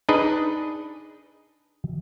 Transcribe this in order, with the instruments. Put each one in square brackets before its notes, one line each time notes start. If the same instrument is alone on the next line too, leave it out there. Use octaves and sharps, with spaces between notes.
[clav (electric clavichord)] D4 D#4 G#4 B4 D#5